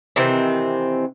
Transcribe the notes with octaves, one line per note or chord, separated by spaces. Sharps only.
C3 D#3 E3 C4